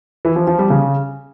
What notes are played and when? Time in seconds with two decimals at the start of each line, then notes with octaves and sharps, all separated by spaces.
0.25 E3
0.36 F3
0.47 F3
0.59 G3
0.70 C#3